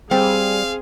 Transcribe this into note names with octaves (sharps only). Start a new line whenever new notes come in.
G3 C4 G#4 F5